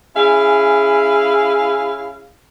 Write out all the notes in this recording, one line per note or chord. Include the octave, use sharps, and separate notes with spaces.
C#4 E4 G#4 F5